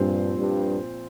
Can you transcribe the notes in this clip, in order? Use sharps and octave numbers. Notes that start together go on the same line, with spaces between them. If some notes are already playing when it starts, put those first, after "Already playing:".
Already playing: G2 A#2 F3 C4 F4 C5
G2